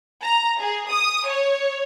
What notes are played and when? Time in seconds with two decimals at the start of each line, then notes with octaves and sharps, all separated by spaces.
0.23 A#5
0.61 G#4
0.90 D#6
1.27 C#5